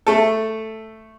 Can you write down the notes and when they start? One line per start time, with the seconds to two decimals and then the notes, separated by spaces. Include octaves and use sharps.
0.07 A3 A4